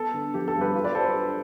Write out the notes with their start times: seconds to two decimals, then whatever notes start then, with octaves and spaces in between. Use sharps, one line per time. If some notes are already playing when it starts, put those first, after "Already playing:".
Already playing: B3 A4
0.14 D3
0.34 F3 G4
0.48 A4
0.54 G2
0.61 G4 B4
0.75 F4
0.84 B4 D5
0.95 G3 A4 C5
1.05 G4 B4
1.15 D4